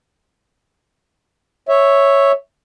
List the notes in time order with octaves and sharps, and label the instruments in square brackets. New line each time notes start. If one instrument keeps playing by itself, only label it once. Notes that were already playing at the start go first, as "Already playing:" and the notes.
[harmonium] C#5 E5